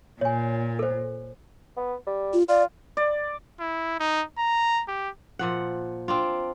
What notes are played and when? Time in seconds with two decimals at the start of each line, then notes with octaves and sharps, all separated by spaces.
0.21 A#2 C#5 G#5
0.79 A4 C5
1.77 B3
2.07 G3
2.33 F4
2.48 F4 D5
2.97 D5
3.60 E4
4.00 D#4
4.39 A#5
4.88 G4
5.39 A#2 F3 F#5
6.08 C4 D4 F4